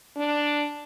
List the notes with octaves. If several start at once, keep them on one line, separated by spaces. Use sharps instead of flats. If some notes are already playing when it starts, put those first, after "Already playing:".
D4